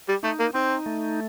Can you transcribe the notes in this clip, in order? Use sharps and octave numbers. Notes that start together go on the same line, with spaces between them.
G3
A3 D#4
A#3
C4 D#4
A3